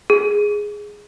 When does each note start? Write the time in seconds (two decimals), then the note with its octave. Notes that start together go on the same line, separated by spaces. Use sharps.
0.10 G#4